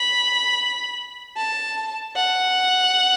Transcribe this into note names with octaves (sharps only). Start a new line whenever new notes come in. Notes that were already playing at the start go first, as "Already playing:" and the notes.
Already playing: B5
A5
F#5